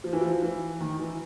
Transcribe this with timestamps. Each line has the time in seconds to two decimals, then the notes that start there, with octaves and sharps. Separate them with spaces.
0.04 F3
0.13 E3
0.21 F3
0.42 E3
0.80 D#3
0.99 E3